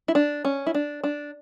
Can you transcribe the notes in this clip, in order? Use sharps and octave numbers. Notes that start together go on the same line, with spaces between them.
E4
D4
C#4
E4
D4
D4